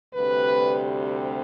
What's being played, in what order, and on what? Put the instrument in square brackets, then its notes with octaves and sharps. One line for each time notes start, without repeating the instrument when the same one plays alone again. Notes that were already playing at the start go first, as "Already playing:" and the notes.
[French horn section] D2 C3 G3 B4